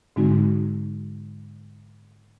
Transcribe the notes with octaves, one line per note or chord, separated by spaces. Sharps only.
G#2 D3 G#3 C4 D#4 F#4